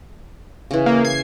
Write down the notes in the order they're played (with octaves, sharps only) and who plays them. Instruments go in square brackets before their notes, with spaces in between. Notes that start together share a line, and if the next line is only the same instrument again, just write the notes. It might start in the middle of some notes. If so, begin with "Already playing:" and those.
[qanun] C#3 E3
[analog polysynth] A#3
G#6 C7